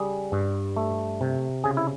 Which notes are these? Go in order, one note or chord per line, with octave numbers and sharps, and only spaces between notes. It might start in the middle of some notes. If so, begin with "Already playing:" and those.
Already playing: C#3 G3 G#4
G2
A3
C3
C#3 G#4
E4